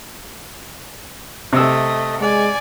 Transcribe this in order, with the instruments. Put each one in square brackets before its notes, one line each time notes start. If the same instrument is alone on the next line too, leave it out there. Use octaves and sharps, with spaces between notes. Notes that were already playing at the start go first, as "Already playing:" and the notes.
[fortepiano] C3 E6 [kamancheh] A3 D#5
[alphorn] G#3 [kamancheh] D5 G#5